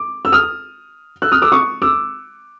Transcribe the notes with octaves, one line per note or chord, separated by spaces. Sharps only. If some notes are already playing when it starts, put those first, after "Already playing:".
Already playing: D6
E6
D#6 F6
E6 F#6
D#6 F6
D6 E6
C#6 D#6
D6 E6